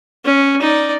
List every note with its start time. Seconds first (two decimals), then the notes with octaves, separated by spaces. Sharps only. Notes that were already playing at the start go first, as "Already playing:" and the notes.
0.25 C#4
0.62 D#4 D5